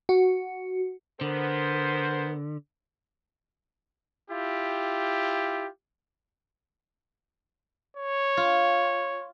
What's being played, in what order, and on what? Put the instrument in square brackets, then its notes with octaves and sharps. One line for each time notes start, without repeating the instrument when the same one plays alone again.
[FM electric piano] F#4
[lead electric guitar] D3 [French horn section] B3 A#4 C5
[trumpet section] E4 F4 G4
[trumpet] C#5
[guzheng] F4